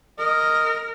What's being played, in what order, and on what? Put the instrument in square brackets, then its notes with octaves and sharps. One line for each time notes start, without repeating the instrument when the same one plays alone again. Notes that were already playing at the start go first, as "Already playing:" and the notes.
[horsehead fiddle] A#4 [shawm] D#5